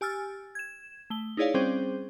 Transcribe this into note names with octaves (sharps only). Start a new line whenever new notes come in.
G4 G#5 E6 F6 A6
G#6 E7
A3 G7
D#4 E4 G#4 C#5 D5 F5
G3 C4 C#4 G#4 C5